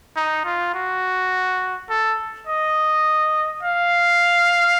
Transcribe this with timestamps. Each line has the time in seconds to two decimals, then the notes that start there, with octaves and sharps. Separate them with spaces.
0.16 D#4
0.45 F4
0.74 F#4
1.90 A4
2.47 D#5
3.63 F5